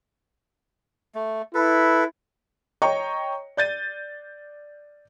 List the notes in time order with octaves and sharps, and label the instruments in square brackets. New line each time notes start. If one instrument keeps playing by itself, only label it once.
[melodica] A3
[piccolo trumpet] E4 [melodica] A4 B4
[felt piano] C#5 D#5 G5 A#5 C#6
D5 G6 A6 D#7